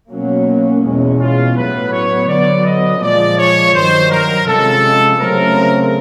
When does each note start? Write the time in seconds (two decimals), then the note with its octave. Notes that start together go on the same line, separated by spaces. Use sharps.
0.11 B2 F#3 A#3 C#4
0.83 E2 B2 G#3 C#4
1.20 F4
1.56 A2 F#3 B3 B4
1.92 C#5
2.28 D3 F#3 B3 D5
2.66 D#5
3.01 A#2 F3 G#3 D5
3.38 C#5
3.74 G2 D#3 F#3 C5
4.11 A#4
4.47 C3 F3 G#3 C#4 A4
5.20 C#3 F#3 A3 C4 A#4